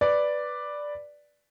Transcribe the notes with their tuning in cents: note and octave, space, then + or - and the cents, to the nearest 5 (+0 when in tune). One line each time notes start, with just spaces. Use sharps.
B4 +0 D5 +0